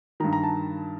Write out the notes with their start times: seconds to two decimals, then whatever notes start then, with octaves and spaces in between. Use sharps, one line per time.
0.20 D#3 A#5
0.24 G2
0.33 A#5
0.43 A5